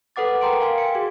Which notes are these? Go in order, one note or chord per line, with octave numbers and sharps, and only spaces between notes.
A4 B4 F#5 D6 A6
A#4 G5 A#5 C6 D7
F5 G#5 C6
C#7
F#4 G#4